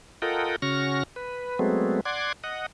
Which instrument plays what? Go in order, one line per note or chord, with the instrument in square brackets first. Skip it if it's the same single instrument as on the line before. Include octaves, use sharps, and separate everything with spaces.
[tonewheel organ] F4 A4 A#4 D#5 F#5 G5
C#3 C#4 F#4 C#6 F6 A#6
B4
F#3 G#3 A3 B3 C4
D5 F#5 C6 D6 G#6
D#5 F#5